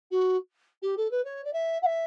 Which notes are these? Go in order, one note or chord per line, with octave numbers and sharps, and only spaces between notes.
F#4
G4
A4
B4
C#5
D5
E5
F#5
E5